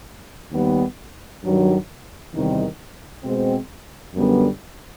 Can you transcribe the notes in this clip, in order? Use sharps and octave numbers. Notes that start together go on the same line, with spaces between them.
D#2 D#3 G3 B3
G2 D#3 F#3
E2 C3 D#3 G3
B2 G#3 C4
F#2 D3 G3 B3